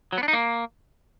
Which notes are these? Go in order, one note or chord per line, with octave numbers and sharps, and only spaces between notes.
F#3
B3
D4
D#4
A#3